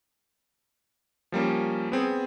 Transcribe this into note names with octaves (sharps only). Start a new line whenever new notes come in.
F3 G3 A#3 C#4
B3 C4 G#4